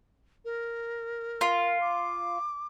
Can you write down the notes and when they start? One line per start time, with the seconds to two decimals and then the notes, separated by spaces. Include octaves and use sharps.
0.45 A#4
1.41 F4
1.81 D6